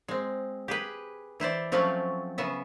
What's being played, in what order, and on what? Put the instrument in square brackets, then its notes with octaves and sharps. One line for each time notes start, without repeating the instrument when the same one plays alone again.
[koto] G#3 C4
G4 G#4 B4
E3 E4 C5 D5
F3 F#3 A3 C4 C#4
C#3 B3 E5